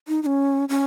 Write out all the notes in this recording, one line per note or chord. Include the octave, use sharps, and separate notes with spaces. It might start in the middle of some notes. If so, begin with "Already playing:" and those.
D#4
D#4
C#4
C#4